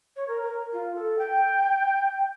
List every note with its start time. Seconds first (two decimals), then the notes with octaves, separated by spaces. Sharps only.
0.16 C#5
0.28 A#4
0.42 A#4
0.73 F4
0.95 A4
1.18 G5